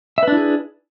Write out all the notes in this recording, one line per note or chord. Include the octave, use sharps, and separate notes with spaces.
D4 E4 G#4 B4 E5